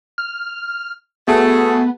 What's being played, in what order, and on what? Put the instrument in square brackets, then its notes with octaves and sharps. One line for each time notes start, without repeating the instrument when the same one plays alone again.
[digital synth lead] F6
[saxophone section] A3 [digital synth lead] B3 [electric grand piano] F#4 G#4 A5